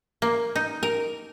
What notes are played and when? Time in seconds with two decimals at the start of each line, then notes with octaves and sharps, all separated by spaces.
0.22 A#3
0.55 D#4
0.83 A#4